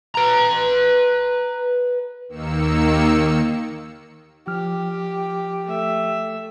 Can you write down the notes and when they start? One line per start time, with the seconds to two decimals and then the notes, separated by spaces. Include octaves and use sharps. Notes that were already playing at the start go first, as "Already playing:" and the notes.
0.15 B4 A#5
2.28 D#2 D#3 A#3 E6 C#7
4.47 F3 G4 F6
5.64 A3 E5